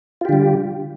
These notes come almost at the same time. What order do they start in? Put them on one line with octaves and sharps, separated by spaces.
F4 G4 D3 G3